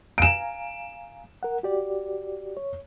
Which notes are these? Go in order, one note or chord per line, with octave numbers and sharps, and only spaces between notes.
F5 G#5 A#5 D7 E7
A#4 F#5
F#4 G4 D5
C#5